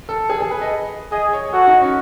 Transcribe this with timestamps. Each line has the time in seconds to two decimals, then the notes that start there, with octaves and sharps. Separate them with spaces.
0.09 A4
0.30 G#4
0.40 G#4
0.51 B4
0.61 D#5
1.12 G#4 D#5
1.33 C#5
1.53 F#4 A4
1.67 D#4
1.81 C#4